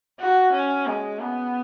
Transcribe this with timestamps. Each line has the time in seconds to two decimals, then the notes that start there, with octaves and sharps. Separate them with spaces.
0.20 F#4
0.53 C#4
0.87 G#3
1.20 B3